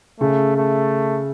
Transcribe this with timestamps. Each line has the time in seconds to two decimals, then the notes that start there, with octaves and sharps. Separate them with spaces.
0.20 C#3 A3
0.56 A3